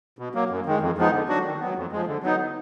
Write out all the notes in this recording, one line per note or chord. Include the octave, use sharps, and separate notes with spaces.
B2
F#3 A#3
F#2
D#3 G#3
F2
F3 G#3 B3 D#4
D3
F#3 D4 F#4
D#3
F#3 B3
F2
F3 G#3
D3
F#3 B3 D#4